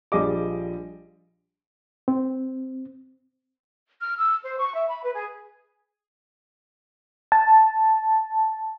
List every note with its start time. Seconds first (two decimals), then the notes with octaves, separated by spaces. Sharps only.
0.12 A#1 F3 G3 G#4 D#5 D6
2.08 C4
4.00 F6
4.17 E6
4.43 C5
4.60 C#6
4.74 E5
4.88 B5
5.03 B4
5.14 G#4
7.32 A5